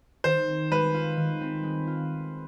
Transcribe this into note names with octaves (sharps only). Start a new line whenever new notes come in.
D#3 C5
C4
G#3 B4
F4
D#3
C4
G#3
F4